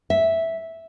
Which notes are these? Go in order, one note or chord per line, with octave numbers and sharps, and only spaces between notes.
E5